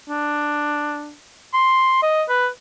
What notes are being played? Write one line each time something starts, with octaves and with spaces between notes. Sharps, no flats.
D4
C6
D#5
B4